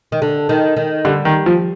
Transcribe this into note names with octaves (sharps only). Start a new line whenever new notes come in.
D#3
D3
D#3
D#3
D3 G3
D#3
F3